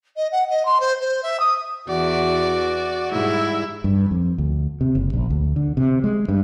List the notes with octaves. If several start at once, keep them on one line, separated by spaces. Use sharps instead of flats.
D#5
F#5
D#5
C6
C5
C5
E5
D#6
E2 E3 F#4 D5
G#2 G3 E4
G2
F2
D2
C3
F#1
A#1
D2
D3
C3
G#3
G2